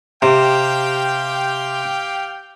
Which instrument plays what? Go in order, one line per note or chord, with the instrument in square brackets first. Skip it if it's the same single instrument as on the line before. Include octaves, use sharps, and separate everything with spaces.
[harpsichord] C3 [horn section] G4 F5 G5